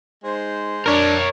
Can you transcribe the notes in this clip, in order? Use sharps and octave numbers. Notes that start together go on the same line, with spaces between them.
G#3 D#4 C5
D4 A#4 C#5